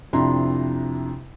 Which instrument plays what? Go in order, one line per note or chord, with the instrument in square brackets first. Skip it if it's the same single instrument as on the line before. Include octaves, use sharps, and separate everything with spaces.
[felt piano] F2 C3 D4 E4 A#5 C6